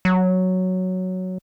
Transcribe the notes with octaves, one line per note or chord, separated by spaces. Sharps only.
F#3